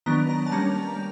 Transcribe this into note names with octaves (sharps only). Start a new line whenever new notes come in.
D#3 F#3 B3 D4 A#5
A#5
A5
G3 A#3 C#4 A#5
G3